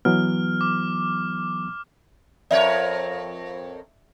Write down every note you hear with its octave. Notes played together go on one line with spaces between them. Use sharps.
E3 F#3 B3 F6
D6
F2 A#4 C#5 D5 E5